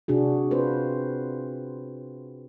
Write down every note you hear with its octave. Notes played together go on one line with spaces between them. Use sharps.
C3 D4 F#4 G#4
C4 F4 B4 C5